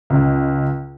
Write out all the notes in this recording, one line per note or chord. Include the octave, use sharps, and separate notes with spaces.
C#2